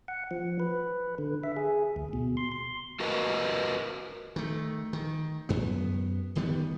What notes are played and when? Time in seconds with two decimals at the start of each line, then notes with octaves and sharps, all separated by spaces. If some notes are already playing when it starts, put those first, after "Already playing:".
0.08 F#5
0.31 F3
0.60 B4
1.18 D3
1.44 E5
1.57 G#4
1.96 D2
2.13 B2
2.37 C6
2.52 C6
3.00 F#4 A#4 B4 D#5
4.36 D#3 A3
4.93 D#3
5.49 F#2 B3
6.35 D1 D#3 G3 B3